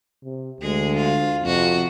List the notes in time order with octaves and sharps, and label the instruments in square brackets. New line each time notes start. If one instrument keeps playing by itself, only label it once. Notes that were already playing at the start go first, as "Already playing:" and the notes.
[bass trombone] C3
[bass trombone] D2 [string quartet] G#3 G#4
[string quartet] F4
[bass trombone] F2 [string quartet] C3 F#4